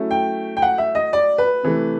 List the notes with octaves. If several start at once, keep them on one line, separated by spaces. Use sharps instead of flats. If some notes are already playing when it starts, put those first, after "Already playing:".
Already playing: F#3 A3 C#4 E4
G5
G5
F#5
E5
D#5
D5
B4
C3 E3 A3